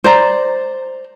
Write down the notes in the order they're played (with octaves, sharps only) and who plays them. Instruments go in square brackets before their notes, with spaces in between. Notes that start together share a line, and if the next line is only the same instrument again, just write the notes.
[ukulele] C5 D5 A#5